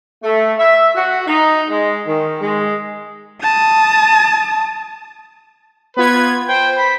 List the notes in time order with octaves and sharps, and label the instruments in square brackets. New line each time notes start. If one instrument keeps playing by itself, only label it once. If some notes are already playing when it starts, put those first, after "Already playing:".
[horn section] A3
E5
F#4
D#4
G#3
D#3
G#3
[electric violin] A5 D#6
[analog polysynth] B3 F4 G#6 [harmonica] B4
[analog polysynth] C5 [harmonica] G5
[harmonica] B5